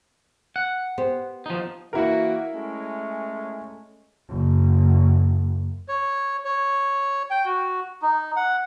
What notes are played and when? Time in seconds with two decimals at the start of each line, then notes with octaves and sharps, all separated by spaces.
0.56 F#5
0.98 B3 G4 C5
1.46 F3 D#4
1.93 E3 A#3 E4 F#4 A#4
2.54 G#3 A3 C#4
4.29 F#1
5.89 C#5
6.45 C#5
7.30 G5
7.46 F#4
8.02 D#4
8.36 F#5